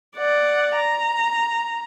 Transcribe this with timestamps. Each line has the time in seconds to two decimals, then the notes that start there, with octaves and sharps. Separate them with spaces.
0.16 D5 F#5
0.77 A#5